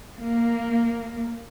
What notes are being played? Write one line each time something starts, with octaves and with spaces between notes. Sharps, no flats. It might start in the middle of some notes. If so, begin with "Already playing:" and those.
A#3